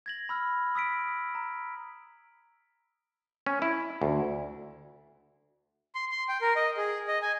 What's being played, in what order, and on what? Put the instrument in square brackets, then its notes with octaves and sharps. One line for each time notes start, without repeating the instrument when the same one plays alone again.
[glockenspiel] G#6 A#6 F#7
B5 E6 F6
D#6 E6 B6 D7
A#5
[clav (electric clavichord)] C#4
E4
D2
[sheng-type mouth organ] C6
C6
G5
A#4
D#5
G#4
D#5
G#5